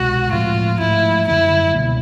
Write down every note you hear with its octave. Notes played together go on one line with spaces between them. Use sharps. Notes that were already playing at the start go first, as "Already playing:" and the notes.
Already playing: C2 B2 G#3 F#4
A2 F3 G#3 C4 F4
G#2 F3 A3 E4
F#2 D3 G3 A#3 E4
C#2 B2 G3 A#3